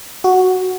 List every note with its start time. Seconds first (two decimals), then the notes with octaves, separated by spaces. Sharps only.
0.24 F#4